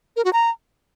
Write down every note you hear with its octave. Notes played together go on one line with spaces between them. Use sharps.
A#4
F#4
A#5